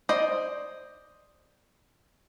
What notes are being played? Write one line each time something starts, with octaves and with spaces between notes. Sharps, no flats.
C5 D5 D#5